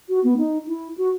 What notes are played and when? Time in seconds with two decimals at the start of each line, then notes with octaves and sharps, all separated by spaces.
0.09 F#4
0.24 B3
0.37 D#4
0.67 E4
0.98 F#4